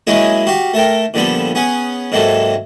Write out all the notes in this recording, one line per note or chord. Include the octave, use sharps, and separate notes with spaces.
F#3 G#3 A#3 C#4 E4 G#4
F#4 G4 F5
A3 A4 A#4 G5
A#2 D3 F3 G3 B3 A4
B3 C#4 G#4 F#5
G#2 C3 F#3 A#3 C4 A4